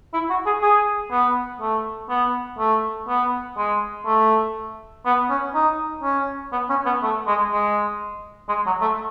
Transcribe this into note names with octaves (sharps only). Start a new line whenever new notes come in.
E4
F#4
G#4
G#4
B3
A3
B3
A3
B3
G#3
A3
B3
C#4
D#4
C#4
B3
C#4
B3
A3
G#3
G#3
G#3
F#3
A3